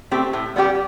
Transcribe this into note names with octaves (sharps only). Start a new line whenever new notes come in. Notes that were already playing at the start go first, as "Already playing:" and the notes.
A3 C4 G4
A2
G3 B3 E4 G4